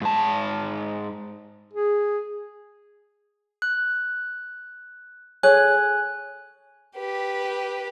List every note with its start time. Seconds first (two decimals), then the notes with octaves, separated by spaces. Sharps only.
0.02 G#2 A5
1.74 G#4
3.62 F#6
5.43 G#4 A4 C#5 G#5 F#6
6.97 G4 B4